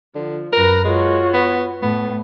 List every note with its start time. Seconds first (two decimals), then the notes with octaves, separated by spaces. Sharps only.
0.16 D3 F3
0.53 F#2 A#4 B4 A#6
0.84 G#3 F4 F#4 C#5
1.34 B3
1.82 A2 B3